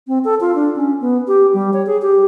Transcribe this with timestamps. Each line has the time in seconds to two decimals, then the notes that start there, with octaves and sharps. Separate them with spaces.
0.08 C4
0.25 A4
0.41 F4
0.55 D4
0.76 C#4
1.01 B3
1.28 G4
1.54 G3
1.73 C#5
1.86 G#4
2.02 G4